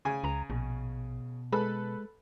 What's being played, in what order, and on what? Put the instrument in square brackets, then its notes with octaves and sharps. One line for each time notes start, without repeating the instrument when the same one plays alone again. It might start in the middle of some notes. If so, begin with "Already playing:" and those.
[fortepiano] C#3 G#5
[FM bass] C#2 [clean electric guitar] A#5
[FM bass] A#1 [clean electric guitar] B2
[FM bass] G#3 [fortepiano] A4 B4 B5